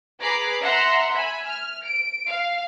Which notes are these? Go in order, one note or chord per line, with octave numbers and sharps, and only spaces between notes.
G#4 B4 A#5 B5 D6 C7
E5 F#5 A#5 C6
E5 G#5 B5
F6
D7
F5